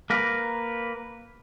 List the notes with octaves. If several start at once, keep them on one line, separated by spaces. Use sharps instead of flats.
A#3 A#4 B4